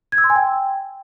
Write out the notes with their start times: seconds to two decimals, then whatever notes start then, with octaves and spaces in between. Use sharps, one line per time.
0.12 G#6
0.18 E6
0.24 C6
0.30 G#5
0.36 G5